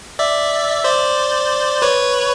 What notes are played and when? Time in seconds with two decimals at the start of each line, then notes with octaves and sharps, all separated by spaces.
0.19 D5 E5
0.84 C5 D5
1.82 B4 C#5